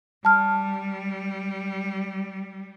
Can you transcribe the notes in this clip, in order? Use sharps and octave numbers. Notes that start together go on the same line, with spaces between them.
G3 A5 F6